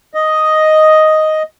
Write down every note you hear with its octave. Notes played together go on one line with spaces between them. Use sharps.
D#5